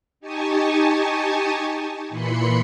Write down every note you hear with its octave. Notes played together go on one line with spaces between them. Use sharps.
D#4 G4 G#5 A5 C#6 D#6
A#2 E3 B5 C6 C#7